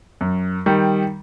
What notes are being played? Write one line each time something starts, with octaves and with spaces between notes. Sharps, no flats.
F#2
D#3 G3